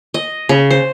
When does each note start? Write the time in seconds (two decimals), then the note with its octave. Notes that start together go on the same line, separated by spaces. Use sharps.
0.14 D#5
0.49 C#3
0.70 C5